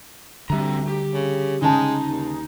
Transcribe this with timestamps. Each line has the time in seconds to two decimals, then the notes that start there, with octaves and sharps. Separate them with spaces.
0.50 D2 D3 G3 C4 E5 A#5
0.88 G4
1.13 C#3
1.62 C#3 G#3 D#4 A5
2.07 D#2